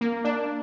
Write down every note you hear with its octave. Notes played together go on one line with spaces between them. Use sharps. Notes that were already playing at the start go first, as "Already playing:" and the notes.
A#3
D4